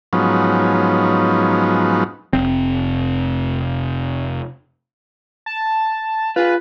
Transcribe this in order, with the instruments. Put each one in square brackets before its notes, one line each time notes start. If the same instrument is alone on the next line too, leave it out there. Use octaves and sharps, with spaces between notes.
[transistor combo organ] G#2 F3 F#3 B3 C#4 D#4
[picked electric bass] F1 C4
[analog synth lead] A5
[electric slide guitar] F4 G#4 [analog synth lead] B4